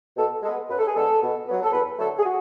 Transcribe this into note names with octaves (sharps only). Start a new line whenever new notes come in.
B2 A4
G#3 B3 A4
F#2 B4
A4
G#4
D3 G#3 B3 A4
B2
F#3 B3
A4
E2 B4
D3 F#3 A3 A4
G#4
F#4